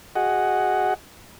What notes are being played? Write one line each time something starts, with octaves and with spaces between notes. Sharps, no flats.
F#4 G#4 D#5 F#5